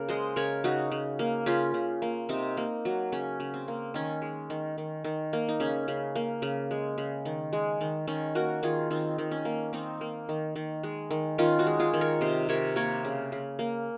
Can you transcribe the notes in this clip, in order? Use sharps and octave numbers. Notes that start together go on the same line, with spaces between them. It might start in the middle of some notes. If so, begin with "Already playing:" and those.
Already playing: C#3 A#3 A#4
G#3 C5 D#5
C#3 A#4 C#5
C#3 D#4 F#4
C#3
A#3
C#3 C#4 F4
C#3
A#3
C3 C4 D#4
A#3
F#3
C#3 C#4
C#3
C4
A#3
D#3 C#4
G#3
D#3
D#3
D#3
A#3
D#4
C#3 C#4
C#3
A#3
C#3
G#3
C#3
D#3
G#3
D#3
D#3 C#4
A#3 F#4 A#4
D#3 F4 G#4
D#3 C4 D#4
D#3
C#4
A#3
D#3 C4 D#4
A#3
D#3
D#3
G#3
D#3
D#3 C#4 F4
D#4 F#4
G#3
F4 G#4
D#3
A#4 C#5
C3 C5 D#5
C3 A#4 C#5
A#3 A#4 C#5
C#3
C#3
A#3